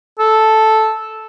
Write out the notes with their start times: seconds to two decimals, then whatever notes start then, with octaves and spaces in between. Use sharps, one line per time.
0.20 A4